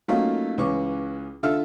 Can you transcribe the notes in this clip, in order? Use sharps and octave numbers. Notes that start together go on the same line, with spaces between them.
F#3 A3 A#3 C#4 D#4 F4
C#2 E3 C#4 C#6 D6
D3 F4 A4 E5 F5 F6